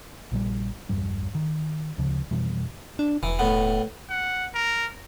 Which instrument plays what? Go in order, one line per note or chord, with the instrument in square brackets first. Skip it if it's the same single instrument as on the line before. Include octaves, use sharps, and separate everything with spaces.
[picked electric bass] A#1 A#2 G3
A#1 E2 G2 G3
D#3
D2 C#3 F3
F2 B2 E3 G3
[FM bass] D4
[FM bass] E1 [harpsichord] E3
[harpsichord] A2 B3
[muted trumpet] F#5
A#4